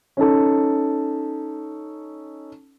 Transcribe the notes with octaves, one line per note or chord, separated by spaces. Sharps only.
C#4 D#4 A4